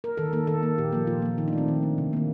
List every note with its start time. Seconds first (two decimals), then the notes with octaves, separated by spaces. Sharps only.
0.04 A#4
0.17 D#3 A4
0.33 A#3 A4
0.47 D#3 A4
0.63 A#3
0.78 A#2 G4
0.93 F3 A#3
1.07 A#2 F4
1.22 F3 A#3
1.38 D#3 D#4
1.48 D4
1.53 A3 C4
1.68 D#3
1.83 A3
1.98 C3
2.13 D#3 A#3